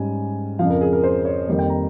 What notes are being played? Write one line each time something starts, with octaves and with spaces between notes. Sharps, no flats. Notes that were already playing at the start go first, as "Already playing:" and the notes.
Already playing: G#2 G3 C#4 G#5
F2 C#3 F3 F5
A#4
G#4
A#4
C5
C#5
F2 D#3 G3 A#3
G5
A#5